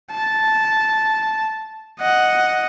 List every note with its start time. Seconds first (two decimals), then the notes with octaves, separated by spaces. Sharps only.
0.11 A5
2.00 D#5 F#5